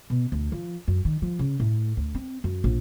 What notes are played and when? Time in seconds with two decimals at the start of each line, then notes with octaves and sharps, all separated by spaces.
0.10 B2
0.32 D2
0.52 F3
0.88 F#2
1.05 D#3
1.22 F3
1.39 C#3
1.60 A2
1.97 D2
2.15 C4
2.44 F#2
2.64 A#1